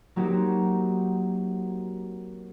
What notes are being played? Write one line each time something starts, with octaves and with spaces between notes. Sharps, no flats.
F#3 A#3 C4 D#4 F#4 G4